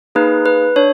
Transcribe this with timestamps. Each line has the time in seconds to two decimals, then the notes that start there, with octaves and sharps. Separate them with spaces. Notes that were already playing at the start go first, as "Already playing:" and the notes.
0.15 A#3 D#4 G#4 B4
0.46 B4
0.76 D4 C#5